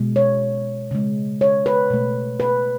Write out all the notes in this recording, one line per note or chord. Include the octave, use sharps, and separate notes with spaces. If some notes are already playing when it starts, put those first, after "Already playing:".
Already playing: B2 G#3
C#5
C#3 G#3
C#5
B4
B2 A3
B4